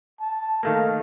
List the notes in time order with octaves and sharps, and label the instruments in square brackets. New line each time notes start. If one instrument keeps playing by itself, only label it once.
[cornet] A5
[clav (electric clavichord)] D#3 A3 A#3 [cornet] F5